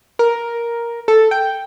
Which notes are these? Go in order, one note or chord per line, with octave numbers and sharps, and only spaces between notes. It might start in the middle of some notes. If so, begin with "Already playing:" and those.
A#4
A4
G5